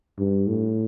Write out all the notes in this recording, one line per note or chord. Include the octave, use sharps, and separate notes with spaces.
G2
A2